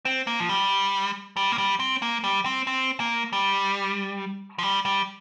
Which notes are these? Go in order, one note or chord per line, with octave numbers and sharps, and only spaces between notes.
C4
A#3
F3
G3
G3
A#3
G3
C4
A#3
G3
C4
C4
A#3
G3
F3
G3
G3